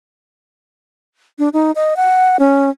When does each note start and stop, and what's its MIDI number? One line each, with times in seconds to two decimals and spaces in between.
1.39 1.49 62
1.53 1.71 63
1.75 1.96 75
1.96 2.37 78
2.39 2.70 61